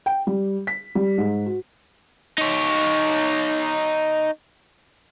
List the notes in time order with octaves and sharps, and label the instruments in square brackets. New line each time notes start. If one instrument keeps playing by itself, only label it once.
[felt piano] G5
G3
B6
G3
G#2
F#4
[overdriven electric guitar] D#4 C#5